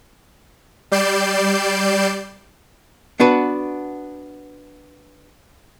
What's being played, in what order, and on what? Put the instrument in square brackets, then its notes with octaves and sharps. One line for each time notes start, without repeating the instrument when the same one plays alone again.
[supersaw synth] G3 D5 G6 C7 D7 E7
[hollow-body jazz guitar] B3 D4 F#4 B4